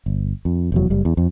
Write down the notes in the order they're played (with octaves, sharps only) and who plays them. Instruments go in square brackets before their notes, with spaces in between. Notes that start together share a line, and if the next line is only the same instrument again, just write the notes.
[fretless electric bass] G1
F2
F1 E2 F#3
F#1 G3
E2
F2